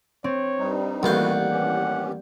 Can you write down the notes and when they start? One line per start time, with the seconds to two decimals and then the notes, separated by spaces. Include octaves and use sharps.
0.24 C4 C#5
0.58 G2 G3 D#4
1.03 A1 D#2 G3 F#4 B4 F5 F#5 G6
1.51 E3 C#4 G4